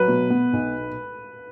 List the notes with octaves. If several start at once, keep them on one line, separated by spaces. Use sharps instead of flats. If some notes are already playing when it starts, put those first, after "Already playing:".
Already playing: F#3 B4
B2
B3
B1